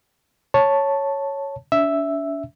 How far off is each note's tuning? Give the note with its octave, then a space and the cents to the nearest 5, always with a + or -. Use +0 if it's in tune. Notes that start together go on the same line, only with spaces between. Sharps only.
C#5 +0 A5 +0
D4 -40 E5 +0